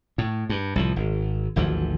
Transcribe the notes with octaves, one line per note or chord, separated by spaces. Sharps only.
A2
G2
C2 A2 F3
G#1
G#1 D2 E3 F3